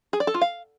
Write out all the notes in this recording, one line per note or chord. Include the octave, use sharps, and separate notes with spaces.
G#4
D5
A4
F4
F5